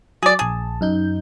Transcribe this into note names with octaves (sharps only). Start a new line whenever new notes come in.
F#3 G#4 D5
A#1 G#4 A5
F#2 D#4 G6